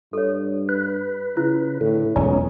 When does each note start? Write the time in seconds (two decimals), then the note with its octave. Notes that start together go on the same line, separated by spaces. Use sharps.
0.13 G2 A4 C#5
0.69 B4
1.37 C#3 E4 B4
1.81 A2 D3
2.16 E1 C#2 F#3 C#4 D#4 D5